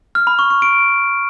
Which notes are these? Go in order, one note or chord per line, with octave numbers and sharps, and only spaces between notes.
F6
B5
C#6
C#6
D7